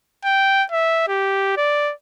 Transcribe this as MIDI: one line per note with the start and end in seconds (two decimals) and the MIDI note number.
0.25 0.64 79
0.72 1.04 76
1.08 1.56 67
1.57 1.92 74